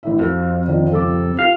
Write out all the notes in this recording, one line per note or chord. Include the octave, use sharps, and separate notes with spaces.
A1 A2 E5
F2 F#4 A4
D3 D#3 F3
C#2 C3 A4 D6
F4 G4 F5